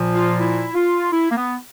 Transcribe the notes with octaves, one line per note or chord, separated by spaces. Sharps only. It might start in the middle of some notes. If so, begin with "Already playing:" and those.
Already playing: A#2 F3
F4
E4
F4
E4
A#3
B3